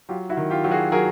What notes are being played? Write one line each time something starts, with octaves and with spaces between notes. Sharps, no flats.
F#3 F4 G4
E4 F#4
D#3
F4 G4
F#3 G4
F#4 G#4
F#3 G#4 A#4